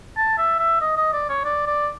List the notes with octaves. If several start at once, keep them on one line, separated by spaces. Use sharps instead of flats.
A5
E5
E5
D#5
D#5
D5
C#5
D5
D5